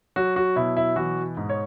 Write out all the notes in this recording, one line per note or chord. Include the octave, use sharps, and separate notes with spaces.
F#3 F#4
F#4
B2 E4
E4
E3 F#4
G#2
C#5